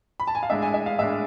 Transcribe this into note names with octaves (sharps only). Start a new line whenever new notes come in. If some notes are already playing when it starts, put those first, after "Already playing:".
B5
A5
G#5
F5
A2 G#3 D4 E5
G#5
E5
F5
A2 G#3 D4 E5